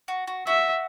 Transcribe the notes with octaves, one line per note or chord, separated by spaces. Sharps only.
F#4
F#4
F#4 E5